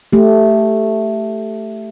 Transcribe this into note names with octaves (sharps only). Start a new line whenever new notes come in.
A3 G4